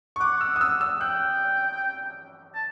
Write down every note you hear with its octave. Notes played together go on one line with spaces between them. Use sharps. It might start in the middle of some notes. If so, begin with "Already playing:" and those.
C#6
F#5 D6
E6
D#6
E6
E6
G5 F#6
A5